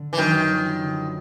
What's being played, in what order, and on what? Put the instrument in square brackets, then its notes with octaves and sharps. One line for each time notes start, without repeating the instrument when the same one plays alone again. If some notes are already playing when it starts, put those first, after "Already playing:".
Already playing: [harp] D3
[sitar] E3
[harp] F#2 [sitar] D#3
[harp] F3
D3